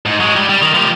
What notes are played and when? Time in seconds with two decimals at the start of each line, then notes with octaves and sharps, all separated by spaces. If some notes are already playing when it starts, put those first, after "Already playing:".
0.06 G#2
0.20 F#3 G#3
0.36 G3 G4
0.49 G3
0.62 D#3
0.74 F3 G4